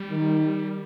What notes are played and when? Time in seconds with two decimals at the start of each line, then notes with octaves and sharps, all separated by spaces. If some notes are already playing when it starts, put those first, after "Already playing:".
Already playing: G3
0.10 D#3